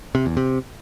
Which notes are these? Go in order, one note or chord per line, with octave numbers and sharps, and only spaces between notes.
C3
E2
C3